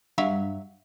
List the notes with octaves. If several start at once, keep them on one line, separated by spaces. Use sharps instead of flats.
G2 F#3 E5 F5